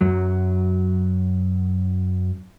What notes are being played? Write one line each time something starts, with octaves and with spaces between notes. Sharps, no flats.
F#2 F#3